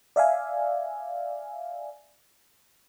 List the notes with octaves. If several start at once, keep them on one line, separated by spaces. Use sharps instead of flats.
D5 E5 F5 G#5